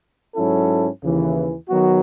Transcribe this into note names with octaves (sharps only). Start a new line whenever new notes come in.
G#2 F#3 C#4 E4 A4
D#2 C#3 E3
D#3 F#3 B3 F#4